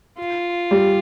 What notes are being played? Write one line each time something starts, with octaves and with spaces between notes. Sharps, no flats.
F4
G3